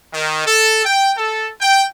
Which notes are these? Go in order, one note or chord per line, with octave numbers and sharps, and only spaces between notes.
D#3
A4
G5
A4
G5